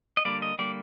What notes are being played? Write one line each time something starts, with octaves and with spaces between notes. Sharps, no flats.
D#5
D3 G3 A#3 D5
D#5
D3 G3 A#3 D5